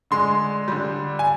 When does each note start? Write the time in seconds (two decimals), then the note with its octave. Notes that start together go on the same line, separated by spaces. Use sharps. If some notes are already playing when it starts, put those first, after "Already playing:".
0.11 D3 G#3 C6
0.68 D3 G3
1.19 G#5